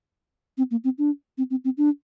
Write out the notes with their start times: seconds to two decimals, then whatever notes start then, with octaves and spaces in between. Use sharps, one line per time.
0.58 C4
0.71 A#3
0.84 C4
0.98 D4
1.38 C4
1.50 C4
1.65 C4
1.77 D4